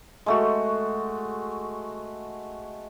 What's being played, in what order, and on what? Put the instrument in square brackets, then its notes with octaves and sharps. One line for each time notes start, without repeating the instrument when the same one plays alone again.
[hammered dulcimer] G#3 A3 F#4